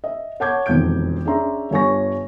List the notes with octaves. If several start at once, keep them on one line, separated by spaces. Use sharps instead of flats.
D#5 E5
C#5 F#5 A5 D6 G6 G#6
E1 F2 D#3 B3 G6 D7
C#4 D4 G#4 E5 A#5 C6
G1 G2 C#5 G#5 C#6 A#6